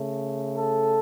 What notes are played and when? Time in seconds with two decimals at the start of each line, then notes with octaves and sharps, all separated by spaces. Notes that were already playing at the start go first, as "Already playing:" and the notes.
Already playing: C#3 A3
0.56 A4